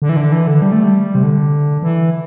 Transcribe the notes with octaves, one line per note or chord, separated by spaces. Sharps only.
D3
E3
D3
E3
D3
G3
A3
G3
C3
D3
E3